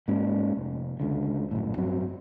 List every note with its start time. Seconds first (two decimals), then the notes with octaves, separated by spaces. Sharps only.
0.08 G#2 G#3 A#3 C#4
0.57 F1
1.00 C#2 D3
1.51 A#1 F#2 A2
1.77 G2 F#3 C4